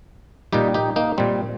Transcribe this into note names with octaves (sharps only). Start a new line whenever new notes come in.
A#2 G3 D#4 G4
D#4 G4
A#3 D#4
A#2 G3 C4